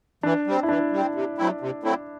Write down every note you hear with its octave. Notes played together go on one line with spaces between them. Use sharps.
E3 D4
G3 C4
E4
E3 D4
G3 C4
C3
F#3 A3 C4 E4
C3
F#3 A3 C4 E4